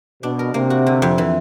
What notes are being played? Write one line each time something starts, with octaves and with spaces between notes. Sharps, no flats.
B2 D4
A#4
C3 A#3
F#4
D3
F2
E3